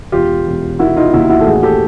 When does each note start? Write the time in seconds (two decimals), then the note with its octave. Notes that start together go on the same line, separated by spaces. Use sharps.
0.12 E1 F4 G4
0.47 E1
0.79 D#3 E4 F#4
0.97 D#4 F4
1.13 D#2 E4 F#4
1.29 E4 F#4
1.40 A4
1.46 A1 F#4 G#4
1.63 G4 A4